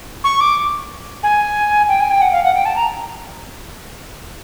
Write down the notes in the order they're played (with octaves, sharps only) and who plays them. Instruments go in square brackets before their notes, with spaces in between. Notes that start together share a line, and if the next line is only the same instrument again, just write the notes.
[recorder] C#6
D6
G#5
G5
G#5
G5
F#5
F5
F#5
G5
A5
A#5